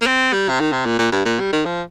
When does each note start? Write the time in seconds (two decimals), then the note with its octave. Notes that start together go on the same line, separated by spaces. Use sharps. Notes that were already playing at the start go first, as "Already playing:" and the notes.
0.02 A#3
0.07 C4
0.33 G3
0.49 C3
0.60 D#3
0.72 C3
0.86 A#2
0.99 A#2
1.12 G2
1.25 A#2
1.40 G3
1.53 D#3
1.65 F3